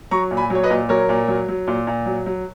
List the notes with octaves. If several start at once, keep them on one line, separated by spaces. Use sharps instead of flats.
F#3 A#5 C#6
A#2
G#5 B5
F#3
C#5
B4 D#5
A#2
F#3 A#4 C#5
A#2
F#3
F#3
A#2
A#2
F#3
F#3